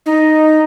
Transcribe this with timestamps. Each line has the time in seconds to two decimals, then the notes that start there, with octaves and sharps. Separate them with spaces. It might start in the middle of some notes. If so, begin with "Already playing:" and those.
0.06 D#4